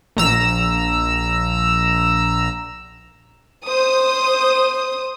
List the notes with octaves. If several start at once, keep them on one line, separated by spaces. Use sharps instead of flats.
A#1 A#5 E6
C5 D#6